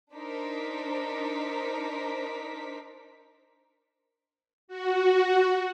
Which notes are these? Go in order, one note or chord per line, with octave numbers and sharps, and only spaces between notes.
D4 D#4 A#4 C5 B6
F#4